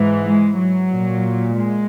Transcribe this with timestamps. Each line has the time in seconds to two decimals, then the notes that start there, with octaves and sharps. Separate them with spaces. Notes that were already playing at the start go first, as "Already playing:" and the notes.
Already playing: G#2 E3
0.27 G#3
0.58 F#3
0.91 A#2
1.56 G#3